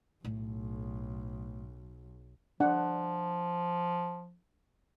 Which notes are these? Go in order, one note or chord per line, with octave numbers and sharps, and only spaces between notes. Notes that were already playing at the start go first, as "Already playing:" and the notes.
B1 A2
F3 D4 F#5